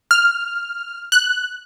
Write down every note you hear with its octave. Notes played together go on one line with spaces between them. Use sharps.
F6
F#6